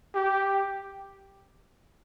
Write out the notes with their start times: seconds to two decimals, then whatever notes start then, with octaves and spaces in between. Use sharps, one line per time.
0.15 G4